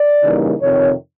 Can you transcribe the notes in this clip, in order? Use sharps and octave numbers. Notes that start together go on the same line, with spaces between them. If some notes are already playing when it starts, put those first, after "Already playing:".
Already playing: D5
C#3 E3 G3 A#3 D#4
F2 C3 D#3 C#5